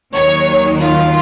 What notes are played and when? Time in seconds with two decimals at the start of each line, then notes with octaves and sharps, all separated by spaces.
0.13 D#2 D#3 F#3 C#5
0.80 F4